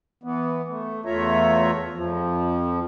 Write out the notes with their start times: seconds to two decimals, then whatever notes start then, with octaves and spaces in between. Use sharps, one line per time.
0.23 E3 B3
0.68 A3
1.05 E2 A3 F4 C#5 E5 A#5
1.94 F2 F3